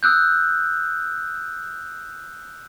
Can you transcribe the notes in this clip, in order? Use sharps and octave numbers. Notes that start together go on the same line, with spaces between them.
D#6 E6 F#6 G6